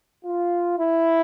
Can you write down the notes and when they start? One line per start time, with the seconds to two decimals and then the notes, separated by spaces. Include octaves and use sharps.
0.24 F4
0.78 E4